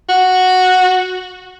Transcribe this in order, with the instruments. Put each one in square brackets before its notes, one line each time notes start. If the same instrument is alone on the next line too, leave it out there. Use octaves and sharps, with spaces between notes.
[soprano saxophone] F#4